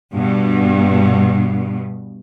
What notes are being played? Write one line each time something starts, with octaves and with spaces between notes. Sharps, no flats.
G2 B2